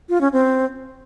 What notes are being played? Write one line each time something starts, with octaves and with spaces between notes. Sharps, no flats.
F4
C#4
C4